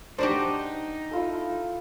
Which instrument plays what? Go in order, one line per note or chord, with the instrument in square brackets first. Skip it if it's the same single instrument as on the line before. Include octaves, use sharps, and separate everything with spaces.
[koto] D4 F#4 G4 [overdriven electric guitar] D#4 [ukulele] C5
[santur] E4 F4 A4